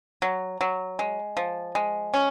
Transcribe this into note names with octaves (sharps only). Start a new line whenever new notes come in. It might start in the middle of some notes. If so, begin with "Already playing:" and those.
F#3
F#3
G#3
F3
G#3
C#4